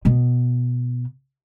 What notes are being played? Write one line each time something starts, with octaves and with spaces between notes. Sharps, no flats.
B2 B3